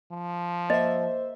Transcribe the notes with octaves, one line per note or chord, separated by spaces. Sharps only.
F3
A#3 C5 D#5 E5